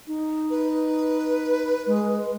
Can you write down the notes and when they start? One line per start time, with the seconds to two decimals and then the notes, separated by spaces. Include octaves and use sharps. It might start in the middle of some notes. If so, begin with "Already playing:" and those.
0.07 D#4
0.50 B4
1.86 G#3